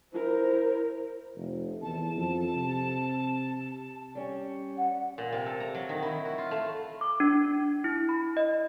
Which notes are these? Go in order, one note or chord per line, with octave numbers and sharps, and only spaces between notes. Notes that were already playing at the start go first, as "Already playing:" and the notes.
E4 A#4 C5
F1
E2 A5
F2
C3
G3 C#4
F#5
A#2
C3
A4
A#5
F#3
D#3
E4
F#4
F4
A3
D6
D4
E4
B5
D#5